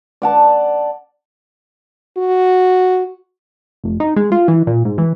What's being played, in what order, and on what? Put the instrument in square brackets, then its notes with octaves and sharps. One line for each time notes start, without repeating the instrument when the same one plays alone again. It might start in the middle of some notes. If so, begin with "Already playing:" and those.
[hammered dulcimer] D5 F#5 A5
[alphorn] F#4
[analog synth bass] F1
D#4
G#3
F4
E3
A#2
G#2
E3